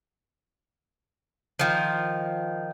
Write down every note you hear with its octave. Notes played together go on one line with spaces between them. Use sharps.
D#3 F3